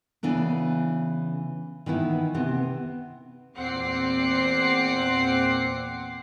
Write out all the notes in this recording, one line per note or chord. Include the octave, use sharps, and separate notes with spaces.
C#3 E3 B3 D4
D#3 E3 B3 E4
C3 B3 C4
E2 A#2 C4 F#5 D6 C7